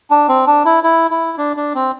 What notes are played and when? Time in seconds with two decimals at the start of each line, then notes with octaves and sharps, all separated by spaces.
0.11 D4
0.29 C4
0.46 D4
0.65 E4
0.84 E4
1.11 E4
1.38 D4
1.57 D4
1.75 C4